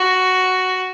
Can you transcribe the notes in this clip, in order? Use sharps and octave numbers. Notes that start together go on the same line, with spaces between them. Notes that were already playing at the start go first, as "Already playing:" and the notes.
Already playing: F#4